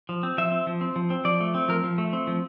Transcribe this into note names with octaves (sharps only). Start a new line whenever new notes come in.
F3
C4
F3 E5
C4
F3
C4
F3
C4
F3 D5
A3
C4
F3 A#4
F3
A3
C4
F3